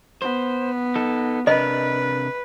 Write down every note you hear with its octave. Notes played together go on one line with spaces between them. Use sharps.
B3 C5
D#4 A4
C3 D4 A#4 B4 D#5